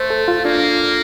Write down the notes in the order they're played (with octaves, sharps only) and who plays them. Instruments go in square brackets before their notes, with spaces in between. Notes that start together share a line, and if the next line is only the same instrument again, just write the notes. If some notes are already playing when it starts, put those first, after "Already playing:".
Already playing: [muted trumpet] A3 [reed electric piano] C5
[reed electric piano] A4
F4
[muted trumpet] A#3 [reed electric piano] D4